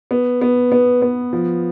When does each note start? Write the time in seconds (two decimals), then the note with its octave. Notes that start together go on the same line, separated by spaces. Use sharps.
0.11 B3
0.41 B3
0.72 B3
1.02 B3
1.33 F3